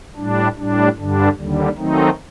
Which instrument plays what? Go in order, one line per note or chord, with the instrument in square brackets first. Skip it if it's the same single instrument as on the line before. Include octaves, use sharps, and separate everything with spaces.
[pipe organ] A2 G3 D4
A2 G3 D4
G2 D3 G3 D4
D#2 D3 G3
D#3 F#3 A3 C4 D#4